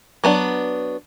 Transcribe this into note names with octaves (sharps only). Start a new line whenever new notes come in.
F#3 B3 D4